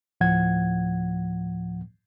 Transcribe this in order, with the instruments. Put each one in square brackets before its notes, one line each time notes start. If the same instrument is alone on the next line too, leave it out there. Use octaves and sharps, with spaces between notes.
[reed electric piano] D2 A2 F3 F#5 G#6